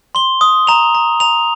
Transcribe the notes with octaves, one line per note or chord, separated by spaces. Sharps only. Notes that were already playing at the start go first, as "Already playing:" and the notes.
C6 G7
D#6
A#5 F7
A#5
A#5 F7